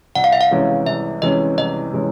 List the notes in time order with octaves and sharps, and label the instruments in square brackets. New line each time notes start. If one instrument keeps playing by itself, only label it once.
[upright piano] C2 [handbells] F#5
[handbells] F5
E5
F5
[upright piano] C3 E3 G#3 C#4
[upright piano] C2 [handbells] E5
[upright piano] C3 E3 G#3 C#4 [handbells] D#5
[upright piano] C2 [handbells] D#5
[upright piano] C3 E3 G#3 C#4